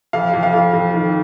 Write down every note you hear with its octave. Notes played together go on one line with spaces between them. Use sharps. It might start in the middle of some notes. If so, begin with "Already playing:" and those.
F2 F5
F2
F5
F2
F2
D#3